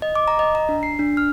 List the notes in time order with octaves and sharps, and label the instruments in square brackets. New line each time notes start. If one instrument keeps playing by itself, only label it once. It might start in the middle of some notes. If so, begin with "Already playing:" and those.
[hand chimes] D#5
D6
A#5
D#5
A#5
D4
C7
D4
F6